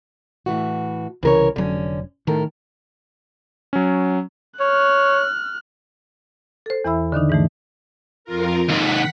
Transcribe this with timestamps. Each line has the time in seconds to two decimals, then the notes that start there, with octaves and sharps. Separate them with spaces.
0.46 A2 E3 F#4
1.23 C2 C#3 E3 A#4 C#5
1.56 F1 D3 F#3 C#4
2.27 A2 D#3 A4 A#4
3.73 F#3 C#4
4.60 C#5 F6 F#6
6.66 A4 C5
6.84 E2 E3 E4 E5 B5 E6
7.12 D3 D#3 D4 D#4
7.30 G#2 E3 A3
8.25 F2 F4 A#4
8.68 D#2 G#2 F#5 B6